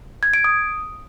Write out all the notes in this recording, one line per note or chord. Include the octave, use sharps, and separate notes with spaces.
G#6
D7
D#6